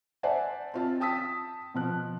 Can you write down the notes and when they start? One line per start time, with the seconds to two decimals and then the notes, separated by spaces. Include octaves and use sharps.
0.23 C5 D5 E5 F#5 G#5 A5
0.74 C4 F4 A5
1.00 G5 A5 D#6 E6 B6
1.74 B2 F3 F#6